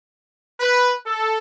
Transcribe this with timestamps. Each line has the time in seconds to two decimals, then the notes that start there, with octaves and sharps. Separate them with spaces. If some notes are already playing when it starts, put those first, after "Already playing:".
0.60 B4
1.07 A4